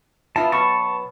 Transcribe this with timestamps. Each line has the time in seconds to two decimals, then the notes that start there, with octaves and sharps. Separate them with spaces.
0.36 B3 E4 F4 A5
0.52 B2 F#3 B3 A5 C#6